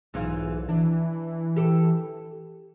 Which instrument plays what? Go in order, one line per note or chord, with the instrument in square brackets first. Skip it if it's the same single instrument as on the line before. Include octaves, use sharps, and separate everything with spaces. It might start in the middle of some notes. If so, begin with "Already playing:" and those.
[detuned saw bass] B1 [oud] G#2 E3 F4
[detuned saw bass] E3 [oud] D4
[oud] G4 A4